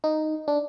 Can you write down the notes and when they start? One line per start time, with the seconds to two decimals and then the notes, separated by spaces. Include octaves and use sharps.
0.04 D#4
0.48 D4